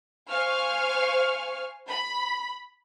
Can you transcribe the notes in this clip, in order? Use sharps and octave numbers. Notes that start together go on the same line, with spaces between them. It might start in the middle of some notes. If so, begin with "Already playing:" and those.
C5 F5 G#5 C#6 F6
B5